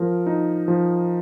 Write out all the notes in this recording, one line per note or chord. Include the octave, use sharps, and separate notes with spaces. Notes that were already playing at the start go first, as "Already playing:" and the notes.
Already playing: F3 A#4
D#4
F3